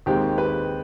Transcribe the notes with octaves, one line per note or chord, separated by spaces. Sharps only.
D#2 D#3 G#3 C4 G4
B4